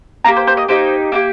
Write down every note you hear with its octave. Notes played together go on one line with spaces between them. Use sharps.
A#3 D#4 G4 A#5
C5
C5
D#5
A#3 D#4 G4 C5
A#3 D#4 G4